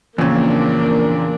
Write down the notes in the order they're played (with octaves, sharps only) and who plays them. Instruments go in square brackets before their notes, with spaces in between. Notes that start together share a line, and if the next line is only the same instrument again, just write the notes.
[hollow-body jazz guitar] E2 C#3 [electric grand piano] A#2 F3 C4 [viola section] A#3 D4